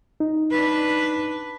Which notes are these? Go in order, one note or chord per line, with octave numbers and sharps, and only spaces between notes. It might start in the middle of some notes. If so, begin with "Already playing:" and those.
D#4
D4 B4